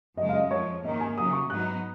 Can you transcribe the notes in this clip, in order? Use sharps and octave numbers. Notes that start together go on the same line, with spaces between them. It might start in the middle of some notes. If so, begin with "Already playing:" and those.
F#2 C#3 G#3 D#5
F5
D#5
F2 F3 G#3 C#5
G#2 D#3 A#3 C#4 D#5
G#5
C#3 F#3 C#4 D#6
C#6
G#2 F#3 B3 D#4 F#6